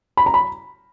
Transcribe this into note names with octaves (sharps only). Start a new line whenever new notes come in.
B5
A#5
B5